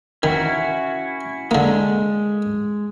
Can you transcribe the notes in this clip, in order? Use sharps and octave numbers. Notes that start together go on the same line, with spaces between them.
D#3 C#4 E4 F#4
D3 G#3 A#3